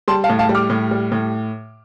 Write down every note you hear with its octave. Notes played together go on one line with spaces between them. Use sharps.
G3 A5 C6
F5 A5
A2
F5 A5
G3
D6 F6
A2
G3
A2